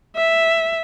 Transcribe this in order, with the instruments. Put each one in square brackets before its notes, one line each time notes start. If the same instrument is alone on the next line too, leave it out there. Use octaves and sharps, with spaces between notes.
[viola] E5